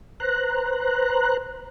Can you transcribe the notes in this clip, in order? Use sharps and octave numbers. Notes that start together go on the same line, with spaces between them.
B4 C5 A#5 F#6